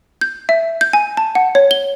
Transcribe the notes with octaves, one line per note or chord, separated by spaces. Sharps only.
G6
E5
G6
G#5
A5
F#5
C#5
G7